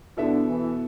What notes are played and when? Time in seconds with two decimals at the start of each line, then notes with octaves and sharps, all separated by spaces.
0.17 B2 D3 B3 E4 A4 E5
0.48 E3